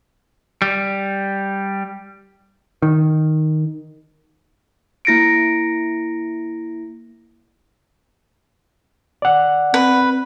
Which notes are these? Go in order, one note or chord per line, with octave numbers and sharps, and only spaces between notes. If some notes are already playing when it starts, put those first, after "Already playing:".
G3
D#3
A#3 E4 A#6 C#7 D7
D5 F#5
C4 B4